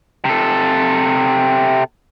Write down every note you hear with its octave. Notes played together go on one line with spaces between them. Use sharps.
C3 A4